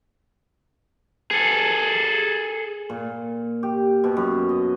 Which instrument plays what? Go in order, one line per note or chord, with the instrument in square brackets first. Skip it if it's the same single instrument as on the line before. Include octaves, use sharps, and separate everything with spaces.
[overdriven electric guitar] G#4 A4
[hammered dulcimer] A#2
G4
B2
F#2
D#5